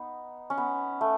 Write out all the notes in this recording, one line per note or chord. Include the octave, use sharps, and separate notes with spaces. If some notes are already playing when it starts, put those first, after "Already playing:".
Already playing: B3 D#4
C#4
B3
A3